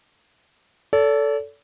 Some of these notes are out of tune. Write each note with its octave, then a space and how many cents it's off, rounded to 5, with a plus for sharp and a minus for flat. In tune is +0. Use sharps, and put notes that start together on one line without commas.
A4 +0 D5 -45